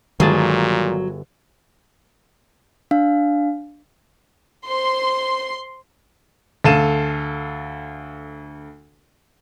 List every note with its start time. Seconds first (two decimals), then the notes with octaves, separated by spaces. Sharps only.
0.20 G1 A#2 D#3 F#3 G#3 G#4 A5
2.91 D4 F5
4.68 C5 C6
6.64 D2 A4 F5 D#7 E7